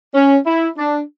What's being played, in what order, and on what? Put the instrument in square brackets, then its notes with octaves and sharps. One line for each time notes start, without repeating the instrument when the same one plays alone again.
[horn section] C#4
E4
D4